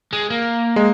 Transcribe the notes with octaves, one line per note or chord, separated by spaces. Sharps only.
G#3
A#3
G#3